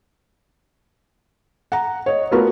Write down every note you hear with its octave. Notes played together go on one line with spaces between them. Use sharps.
F#5 A#5
C#5 D#5
A3 B3 F4 F#4 A#4 B4